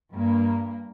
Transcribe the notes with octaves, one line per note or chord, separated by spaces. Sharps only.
G2 A#3